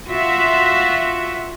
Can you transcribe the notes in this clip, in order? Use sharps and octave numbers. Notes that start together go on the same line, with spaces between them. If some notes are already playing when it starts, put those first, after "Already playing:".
F4 F#4 E5